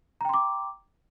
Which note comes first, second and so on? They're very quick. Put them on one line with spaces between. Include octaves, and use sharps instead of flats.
A#5 G5 C6 D6